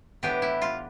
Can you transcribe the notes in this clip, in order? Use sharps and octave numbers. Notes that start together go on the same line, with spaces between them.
A2 E3 B3 D4 G4
E4
F4